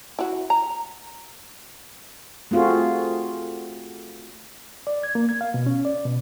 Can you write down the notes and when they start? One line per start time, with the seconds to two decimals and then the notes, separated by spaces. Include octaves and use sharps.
0.19 E4 F#4
0.50 A#5
2.51 A3 C4 F4 F#4 G#4
4.87 D5
5.03 G#6
5.15 A#3
5.29 G#6
5.41 F5
5.54 B2
5.66 C#4
5.85 D5
6.06 B2